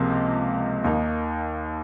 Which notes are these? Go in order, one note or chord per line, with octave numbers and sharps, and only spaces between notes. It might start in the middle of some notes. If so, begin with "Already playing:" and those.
Already playing: C#2 C3 F3 A#3
D#2 D#3 A#3 D#4